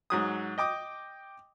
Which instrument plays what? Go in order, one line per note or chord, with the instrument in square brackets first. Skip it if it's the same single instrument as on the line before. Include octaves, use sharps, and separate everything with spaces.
[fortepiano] G#2 F#3 D#6
D#5 G5 D6 D#6